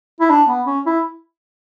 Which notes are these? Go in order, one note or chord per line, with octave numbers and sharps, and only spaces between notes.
E4
D4
B3
C#4
E4